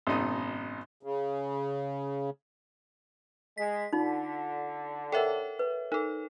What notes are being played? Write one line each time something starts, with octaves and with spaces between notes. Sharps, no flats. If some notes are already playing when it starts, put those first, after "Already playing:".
G#1 F#2 B2 D#4 D#5 D#6
C#3
G#3 B6
D3 D#4 F4
A4 A#4 C#5 E5 F#5 G5
B4
D#4 A4 A#4